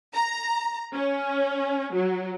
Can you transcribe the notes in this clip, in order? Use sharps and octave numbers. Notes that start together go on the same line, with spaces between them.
A#5
C#4
F#3